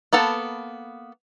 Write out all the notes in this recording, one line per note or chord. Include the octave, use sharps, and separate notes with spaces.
A#3 B3 A4 A5